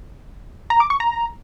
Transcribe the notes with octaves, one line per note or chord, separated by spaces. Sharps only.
A#5
D6
C#6
A#5